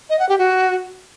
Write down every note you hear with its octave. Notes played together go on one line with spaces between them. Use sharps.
D#5
F#5
G4
F#4